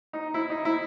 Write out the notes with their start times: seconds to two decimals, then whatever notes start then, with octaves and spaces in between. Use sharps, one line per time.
0.13 D#4
0.34 E4
0.50 D#4
0.65 E4